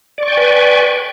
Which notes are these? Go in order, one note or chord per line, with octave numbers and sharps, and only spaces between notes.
B4 D5 G5 G#5 C#6